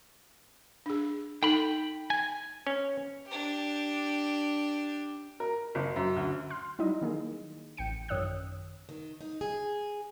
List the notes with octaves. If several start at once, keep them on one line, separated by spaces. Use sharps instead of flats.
D4 G#4
D#4 A4 G5 B5
G#5
C#4
D4 G4
A#4
F#1
F#2
D2
C6 F6
F#3 G3 D#4 E4 D#5
D#3 A#3 G#4
A1 G5 C#7
F#2 D#3 C#5 D#6 E6 F#6
D#3
D#4
G#4